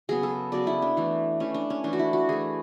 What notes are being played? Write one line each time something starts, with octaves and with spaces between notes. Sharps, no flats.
C#3 F#3 B3 G#4
A4
C#3 F#3 B3 D5
E4
D4
E3 A3
E3 A3 C#4
D4
C#4
E3 A3 D4
F#4
E4
F#4
E3 A3 G#4